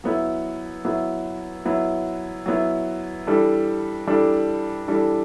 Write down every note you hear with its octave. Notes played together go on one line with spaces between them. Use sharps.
F#3 B3 E4
F#3 B3 E4
F#3 B3 E4
F#3 B3 E4
E3 G3 D4 A4
E3 G3 D4 A4
E3 G3 D4 A4